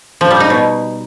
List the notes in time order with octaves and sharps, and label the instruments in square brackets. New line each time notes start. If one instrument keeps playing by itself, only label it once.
[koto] F3
G3
D#4
B2